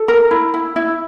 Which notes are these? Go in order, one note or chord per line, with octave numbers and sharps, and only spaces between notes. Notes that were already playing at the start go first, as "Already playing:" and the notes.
Already playing: A4
A#4
E4
E4
E4